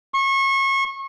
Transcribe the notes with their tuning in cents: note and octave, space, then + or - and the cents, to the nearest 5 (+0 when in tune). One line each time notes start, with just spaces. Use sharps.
C#6 -30